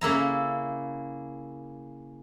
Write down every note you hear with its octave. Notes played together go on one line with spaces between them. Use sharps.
C#3 A#3 E4 A#5